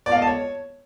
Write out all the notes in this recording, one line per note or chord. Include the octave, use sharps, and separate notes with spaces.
D5
F5
D#5
A5
C#5